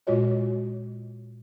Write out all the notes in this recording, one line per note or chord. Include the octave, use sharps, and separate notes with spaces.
A#2 G#3 F4 F#4 C#5 D#5